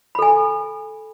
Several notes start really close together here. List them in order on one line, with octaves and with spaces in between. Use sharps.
B5 A4 G#5